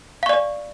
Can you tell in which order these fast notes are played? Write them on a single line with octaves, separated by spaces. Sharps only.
F5 C#6 D5